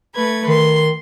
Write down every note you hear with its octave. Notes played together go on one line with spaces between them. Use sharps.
A3 B4 G#6
D#3 C6